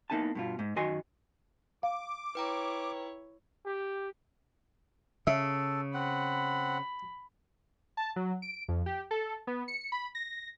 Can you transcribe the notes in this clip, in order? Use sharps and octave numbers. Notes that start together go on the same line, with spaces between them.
A#3 B3 D#4 E4 G#5 A5
G2 B2 F4
G#2
F#2 D#3 F#4 D#5 G#5 C6
F5 D6
E4 B4 C#5 G5 A#5
G4
C#3 A4 E5
C4 F#5 B5
A5
F#3
D7
F2
G4
A4
B3
C#7
B5
A#6